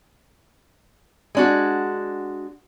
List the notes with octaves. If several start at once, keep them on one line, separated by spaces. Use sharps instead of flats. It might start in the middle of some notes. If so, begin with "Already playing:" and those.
G#3 D4 F#4